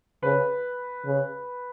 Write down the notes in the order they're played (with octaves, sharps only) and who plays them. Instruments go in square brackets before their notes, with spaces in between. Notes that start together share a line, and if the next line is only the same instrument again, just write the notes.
[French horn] C#3 [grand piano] B4
[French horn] C#3